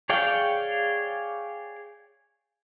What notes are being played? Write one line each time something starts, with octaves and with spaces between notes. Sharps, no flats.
G#4 C#5 D5 F5 G5